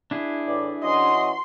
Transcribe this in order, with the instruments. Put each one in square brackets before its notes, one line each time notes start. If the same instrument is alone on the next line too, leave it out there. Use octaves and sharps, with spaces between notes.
[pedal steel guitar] D4 E4 G#4
[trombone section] A2 E3 [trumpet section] D5
[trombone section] E3 C#4 F#4 [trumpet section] D#5 [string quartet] C6